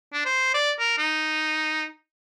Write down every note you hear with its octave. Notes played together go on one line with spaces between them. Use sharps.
D4
C5
D5
A#4
D#4